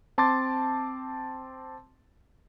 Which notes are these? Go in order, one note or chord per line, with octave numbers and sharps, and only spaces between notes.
C4 A5 C6 D6 A6